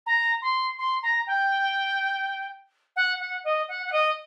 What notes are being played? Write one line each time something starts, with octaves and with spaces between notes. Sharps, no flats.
A#5
C6
C6
A#5
G5
F#5
F#5
D#5
F#5
F#5
D#5